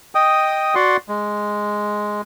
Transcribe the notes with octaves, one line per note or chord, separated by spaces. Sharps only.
D#5 G5 D#6
F#4 D5 F#5 C6
G#3